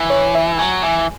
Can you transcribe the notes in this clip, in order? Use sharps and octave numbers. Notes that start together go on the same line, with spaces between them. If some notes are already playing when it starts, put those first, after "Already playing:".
Already playing: E3
C#5
E5
F#3 G#5
E3 G#5